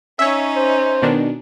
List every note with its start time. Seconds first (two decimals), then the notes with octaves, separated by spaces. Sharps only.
0.19 C#4 D#4 C#5 E5
0.56 C5
1.02 B2 D#3 D4